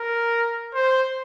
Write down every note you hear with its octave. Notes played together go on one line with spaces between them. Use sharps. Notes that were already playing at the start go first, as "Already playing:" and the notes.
Already playing: A#4
C5